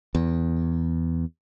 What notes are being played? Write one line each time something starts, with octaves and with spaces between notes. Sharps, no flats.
E2